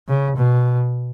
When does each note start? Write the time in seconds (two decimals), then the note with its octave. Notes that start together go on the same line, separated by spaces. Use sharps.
0.08 C#3
0.36 B2